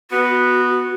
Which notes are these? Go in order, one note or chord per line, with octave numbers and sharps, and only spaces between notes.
B3 F#4